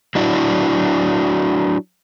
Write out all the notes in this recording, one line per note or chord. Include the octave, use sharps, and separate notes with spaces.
F#3 D4 E4 F#4 D5